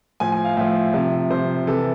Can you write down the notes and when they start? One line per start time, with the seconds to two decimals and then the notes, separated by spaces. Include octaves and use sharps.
0.20 A2 F3 G#5
0.32 G#5
0.44 F5
0.57 A2 F3 E5
0.94 C3 F3
1.30 C3 F3 C5
1.67 C3 E3 A4